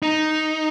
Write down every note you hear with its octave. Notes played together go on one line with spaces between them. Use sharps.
D#4